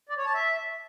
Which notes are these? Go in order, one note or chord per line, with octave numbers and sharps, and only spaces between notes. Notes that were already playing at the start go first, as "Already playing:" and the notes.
D5
C#5
A5
E5